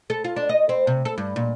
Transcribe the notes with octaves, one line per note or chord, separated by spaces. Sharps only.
A4
F4
D4
D#5
C4
C3
A4
G2
A#2